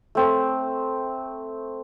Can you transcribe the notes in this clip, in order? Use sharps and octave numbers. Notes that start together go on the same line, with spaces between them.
A3 C4